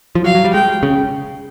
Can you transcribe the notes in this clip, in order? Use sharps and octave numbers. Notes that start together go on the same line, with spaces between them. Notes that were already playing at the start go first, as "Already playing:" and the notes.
F3
F#3 F5
F#3
G3
G#3 G5
C#3